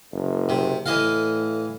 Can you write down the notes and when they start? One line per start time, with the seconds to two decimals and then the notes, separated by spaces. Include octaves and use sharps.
0.12 F#1
0.49 C3
0.86 A2 E3 D#5 F5